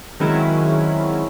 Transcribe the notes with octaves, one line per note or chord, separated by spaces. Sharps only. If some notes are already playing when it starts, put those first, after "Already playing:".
D#3 F#3 G#3 C4 C#4 E4